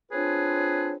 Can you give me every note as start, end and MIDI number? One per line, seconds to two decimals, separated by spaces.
0.12 0.95 60
0.12 0.95 62
0.12 0.95 65
0.12 0.95 68
0.12 0.95 71
0.12 0.95 73